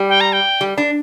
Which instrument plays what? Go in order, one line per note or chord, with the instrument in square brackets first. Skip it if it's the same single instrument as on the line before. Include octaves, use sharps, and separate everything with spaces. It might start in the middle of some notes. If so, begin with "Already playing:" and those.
Already playing: [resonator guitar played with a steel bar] G3
[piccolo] G5
A#5
G5
[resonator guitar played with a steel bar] G3
D4